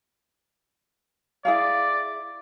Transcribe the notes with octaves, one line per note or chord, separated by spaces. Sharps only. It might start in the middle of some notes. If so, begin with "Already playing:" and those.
E4 G#4 D5 F5